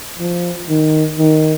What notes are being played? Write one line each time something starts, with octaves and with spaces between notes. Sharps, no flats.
F3
D#3
D#3